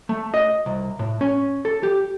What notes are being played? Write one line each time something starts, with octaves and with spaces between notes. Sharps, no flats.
A3
D#5
C2
A2
C#4
A4
G4